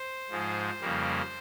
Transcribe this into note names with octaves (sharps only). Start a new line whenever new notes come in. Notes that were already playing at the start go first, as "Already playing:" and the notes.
Already playing: C5
G#2 F3 G#3
F2 C#3 G3 A#3